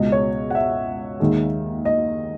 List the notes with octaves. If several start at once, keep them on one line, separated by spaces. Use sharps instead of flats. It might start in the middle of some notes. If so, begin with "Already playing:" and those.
Already playing: C#2 B2 G#3 D#5
C#5
F#5
E5
D#2 D#3 G#3
D#5